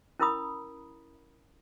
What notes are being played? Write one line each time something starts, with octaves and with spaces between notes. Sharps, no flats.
C#4 E4 A#4 A#5 B5 D#6